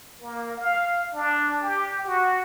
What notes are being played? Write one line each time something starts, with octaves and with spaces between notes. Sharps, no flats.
A#3
F5
D4
G4
F#4